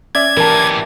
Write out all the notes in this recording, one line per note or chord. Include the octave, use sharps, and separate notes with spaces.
C#4 D5 E5 G#6
E3 G4 A#4 A5